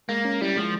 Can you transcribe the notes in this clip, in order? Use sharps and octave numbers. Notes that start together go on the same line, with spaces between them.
G#3 A#3
C#4
G3 E4
F3 G#3